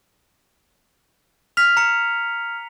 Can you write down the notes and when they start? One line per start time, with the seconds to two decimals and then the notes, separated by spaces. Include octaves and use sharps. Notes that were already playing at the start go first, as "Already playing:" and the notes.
1.57 F6 B6 F7
1.77 A#5 C#7